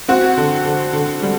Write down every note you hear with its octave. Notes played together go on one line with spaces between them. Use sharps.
C4 F#4
D3
D3
D3
G3